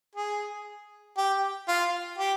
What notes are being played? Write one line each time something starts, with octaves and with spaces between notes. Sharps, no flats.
G#4
G4
F4
G4